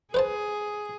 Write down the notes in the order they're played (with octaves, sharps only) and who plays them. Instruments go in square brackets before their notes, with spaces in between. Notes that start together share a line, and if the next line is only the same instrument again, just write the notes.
[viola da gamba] G#4 [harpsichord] B4 C5 A5